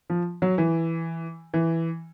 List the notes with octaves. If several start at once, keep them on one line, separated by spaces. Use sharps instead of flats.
F3
F#3
E3
E3